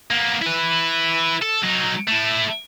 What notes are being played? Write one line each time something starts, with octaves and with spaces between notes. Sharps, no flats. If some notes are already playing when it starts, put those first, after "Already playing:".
A#3 B3
E4 B4
A4
F#3 D#4
A3 E4